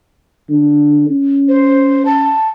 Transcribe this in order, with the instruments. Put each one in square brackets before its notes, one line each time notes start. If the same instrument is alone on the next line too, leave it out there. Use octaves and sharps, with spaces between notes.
[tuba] D3
C#4
[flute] C5
A5